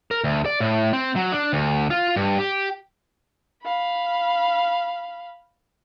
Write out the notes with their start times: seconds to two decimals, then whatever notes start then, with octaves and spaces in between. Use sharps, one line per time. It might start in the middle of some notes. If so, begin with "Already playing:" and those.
0.11 A#4
0.24 D2
0.46 D5
0.60 A2
0.93 C4
1.16 F#3
1.32 D4
1.53 D2
1.90 F4
2.16 G2
2.38 G4
3.63 F5 B5